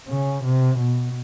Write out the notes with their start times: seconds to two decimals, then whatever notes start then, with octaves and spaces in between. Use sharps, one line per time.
0.09 C#3
0.44 C3
0.79 B2